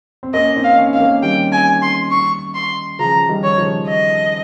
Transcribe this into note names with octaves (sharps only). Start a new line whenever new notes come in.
C4
A#3 C#4 D#5
C4 D#4
F5
A#3 C#4
D#4 F5
A#3 C#4
D#3 G3 G5
G#5
C6
C#6
C6
C#3 F3 A#5
D#3 G3
C#5
C#3 F3
D#5